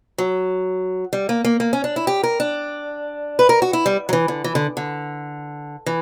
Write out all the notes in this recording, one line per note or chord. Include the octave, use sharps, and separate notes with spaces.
F#3
G3
A#3
A#3
A#3
C#4
D4
E4
G4
A#4
D4
B4
A#4
F#4
E4
G3
F#3
E3
D3
E3
D3
D3
E3